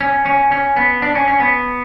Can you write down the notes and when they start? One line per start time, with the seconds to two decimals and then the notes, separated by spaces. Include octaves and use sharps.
0.01 C#4
0.26 C#4
0.52 C#4
0.76 B3
1.02 D4
1.15 C#4
1.28 C#4
1.40 B3